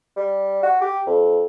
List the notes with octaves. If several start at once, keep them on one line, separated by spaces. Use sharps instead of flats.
G3
F#4
G4
F2